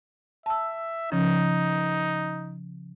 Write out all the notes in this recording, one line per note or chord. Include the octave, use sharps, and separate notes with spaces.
E5 A5 E6
C#3 F3 C#4 D#4